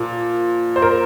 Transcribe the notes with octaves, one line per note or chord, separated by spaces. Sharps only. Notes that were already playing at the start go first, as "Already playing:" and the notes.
Already playing: A#2 F3
C5
A#4